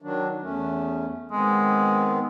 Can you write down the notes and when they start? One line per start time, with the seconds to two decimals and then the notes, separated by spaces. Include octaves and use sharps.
0.02 D#3 F#3 D4
0.42 E2 A3 C#4
1.32 D#3 G#3 B3 C4